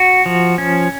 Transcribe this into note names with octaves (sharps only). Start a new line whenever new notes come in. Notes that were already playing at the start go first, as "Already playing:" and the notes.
Already playing: F#4
F3
C#4